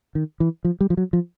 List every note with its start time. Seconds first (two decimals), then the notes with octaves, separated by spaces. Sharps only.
0.15 D#3
0.40 E3
0.65 F3
0.81 G3
0.90 F3
0.97 F#3
1.13 F3